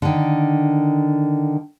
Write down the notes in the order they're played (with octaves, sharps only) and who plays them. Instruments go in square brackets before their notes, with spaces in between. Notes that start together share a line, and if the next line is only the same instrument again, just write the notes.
[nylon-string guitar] D3 D#3